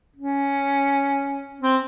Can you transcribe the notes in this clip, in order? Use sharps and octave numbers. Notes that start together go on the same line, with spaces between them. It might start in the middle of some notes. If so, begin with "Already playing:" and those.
C#4
C4